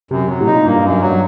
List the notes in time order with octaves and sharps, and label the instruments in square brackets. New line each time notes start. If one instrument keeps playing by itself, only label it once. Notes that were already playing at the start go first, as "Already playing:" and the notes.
[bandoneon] F#2 [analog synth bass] C3
[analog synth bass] C3 [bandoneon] F#3
[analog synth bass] A2
[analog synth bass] A#2 [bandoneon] D#4
[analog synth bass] G2 [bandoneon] A#3
[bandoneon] F#2
F#3